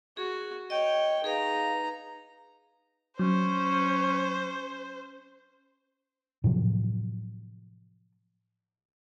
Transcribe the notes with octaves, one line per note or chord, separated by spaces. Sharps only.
F#4 G#4
C#5 D#5 G5
D#4 G#4 B4 F5 A#5
F#3 C#4 C5
A2 C3 F3 F#3